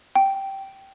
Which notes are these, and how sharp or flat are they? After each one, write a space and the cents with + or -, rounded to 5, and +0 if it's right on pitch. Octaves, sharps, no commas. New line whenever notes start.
G5 -10